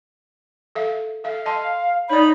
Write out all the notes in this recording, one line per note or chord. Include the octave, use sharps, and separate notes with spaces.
A4 E5 F5
A4 E5 F5
D#5 A5 C6
D#4 C#5 D5 B5